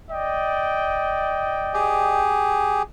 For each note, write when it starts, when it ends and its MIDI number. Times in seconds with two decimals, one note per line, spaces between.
0.11 2.22 74
0.11 2.22 75
0.11 2.22 79
1.74 2.82 67
1.74 2.82 68